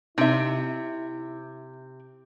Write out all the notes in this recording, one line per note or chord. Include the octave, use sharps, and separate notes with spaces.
C3 D#4 E4 E5